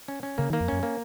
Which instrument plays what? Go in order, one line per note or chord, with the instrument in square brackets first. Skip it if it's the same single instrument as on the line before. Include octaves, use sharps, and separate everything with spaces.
[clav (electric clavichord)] C#4
C#4
[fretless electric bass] C#3 [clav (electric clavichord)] A#3
[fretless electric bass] D#3
[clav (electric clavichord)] A#3
[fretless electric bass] F2
[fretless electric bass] F#2 [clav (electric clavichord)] C#4
[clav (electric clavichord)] A#3